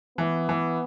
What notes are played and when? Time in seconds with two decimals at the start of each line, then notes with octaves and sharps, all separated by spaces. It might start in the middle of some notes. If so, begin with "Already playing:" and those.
0.18 E3 B3
0.49 E3